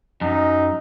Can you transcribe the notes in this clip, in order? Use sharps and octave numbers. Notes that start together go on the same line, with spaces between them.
F#2 D#4